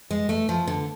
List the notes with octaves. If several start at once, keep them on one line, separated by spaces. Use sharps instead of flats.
G#3
A3
F3
D3